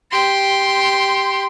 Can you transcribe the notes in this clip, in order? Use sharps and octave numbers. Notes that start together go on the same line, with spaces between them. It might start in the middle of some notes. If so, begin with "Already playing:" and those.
G4 C6